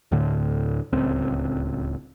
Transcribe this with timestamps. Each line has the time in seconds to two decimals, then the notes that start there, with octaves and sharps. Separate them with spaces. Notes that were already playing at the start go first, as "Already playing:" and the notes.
0.12 D2 A2 D3
0.92 D1 C#2 C4